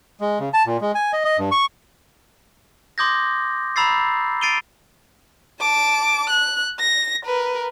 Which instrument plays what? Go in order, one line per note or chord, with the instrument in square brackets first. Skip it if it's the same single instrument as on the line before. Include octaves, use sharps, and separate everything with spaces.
[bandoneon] G#3
C#3
A5
A#2
G#3
G#5
D#5
D#5
G2
C#6
[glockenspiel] C6 D6 D#6 G6 G#6 A#6
A#5 B5 E6 A6 C7
A6 C7 D7 D#7 F7 G7
[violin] A5 D6
F#6
A#6
A#4 B4